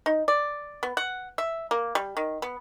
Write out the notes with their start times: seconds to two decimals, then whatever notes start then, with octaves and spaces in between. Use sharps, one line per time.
0.06 D#4
0.28 D5
0.83 B3
0.97 F#5
1.38 E5
1.71 A#3
1.95 G3
2.17 D#3
2.42 B3